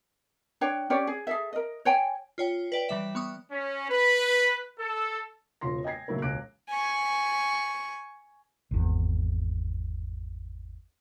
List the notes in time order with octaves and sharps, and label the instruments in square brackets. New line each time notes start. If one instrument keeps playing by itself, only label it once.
[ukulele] D4 C#5 G5
C#4 G4 C#5 D5
G#4
G#4 A4 E5
A#4 D#5
C#5 G5 G#5
[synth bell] F4 C#5 G5
B4 D5 G5
E3 G3 E5
B3 C#6 D#6
[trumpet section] C#4
B4
A4
[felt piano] E1 C#3 F4 C6 A#6
D#5 G5 G#5 G#6 A#6 C7
A#2 C#3 F#3 A3 E4 A#4
E1 C#2 D6 F#6 A#6 D7
[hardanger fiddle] G#5 C#6
[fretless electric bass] G#1 E2